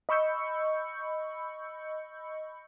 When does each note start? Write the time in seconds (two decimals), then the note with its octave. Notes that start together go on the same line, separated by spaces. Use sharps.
0.09 D#5 B5 C#6 E6 G6 C#7